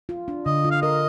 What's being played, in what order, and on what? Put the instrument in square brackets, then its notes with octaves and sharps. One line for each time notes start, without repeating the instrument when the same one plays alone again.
[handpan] F4
D4
[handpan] D3 [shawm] D#5
[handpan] F4
[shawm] F5
[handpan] A#4 [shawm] D#5